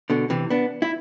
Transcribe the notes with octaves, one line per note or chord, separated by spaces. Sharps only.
B2 D3
C3 E3
B3 D4
E4